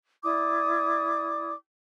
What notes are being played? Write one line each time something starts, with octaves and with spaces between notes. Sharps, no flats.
E4 D5 D6 D#6